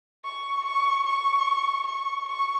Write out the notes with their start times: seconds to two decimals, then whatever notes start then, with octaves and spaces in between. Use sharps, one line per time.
0.24 C#6
0.65 C#6
1.06 C#6
1.87 C#6
2.28 C#6